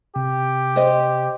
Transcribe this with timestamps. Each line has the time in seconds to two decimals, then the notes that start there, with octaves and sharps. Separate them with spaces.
0.16 C3 G4
0.76 C5 D#5